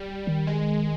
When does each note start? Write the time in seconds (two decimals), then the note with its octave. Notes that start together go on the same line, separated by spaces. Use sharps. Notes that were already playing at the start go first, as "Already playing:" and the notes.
Already playing: G3
0.27 D#3
0.47 G#3